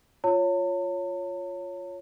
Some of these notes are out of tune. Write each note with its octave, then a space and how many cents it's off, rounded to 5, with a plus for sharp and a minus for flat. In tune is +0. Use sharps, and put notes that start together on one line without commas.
F4 +0 C#5 +0 A5 +45